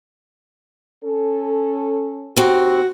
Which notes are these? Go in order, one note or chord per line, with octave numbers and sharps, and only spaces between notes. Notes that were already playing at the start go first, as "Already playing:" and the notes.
C#4 A4
D#2 C4 F#4